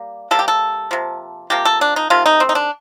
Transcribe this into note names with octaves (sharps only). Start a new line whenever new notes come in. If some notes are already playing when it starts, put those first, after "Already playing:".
Already playing: G3 A#3
C3 G3 A#3 A4
G4
A4
C3 F3 A#3
C3 F3 A#3 G4
A4
D4
D#4
C3 D#3 A3 F4
D#4
C4
D#4
D4